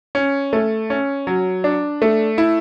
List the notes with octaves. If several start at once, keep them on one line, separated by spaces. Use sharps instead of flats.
C#4
A3
C#4
F#3
D4
A3
E4